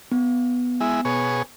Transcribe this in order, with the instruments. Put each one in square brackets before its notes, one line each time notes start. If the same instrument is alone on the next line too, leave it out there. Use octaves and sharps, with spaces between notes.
[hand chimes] B3
[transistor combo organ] G#3 E4
B2 G#4 C#5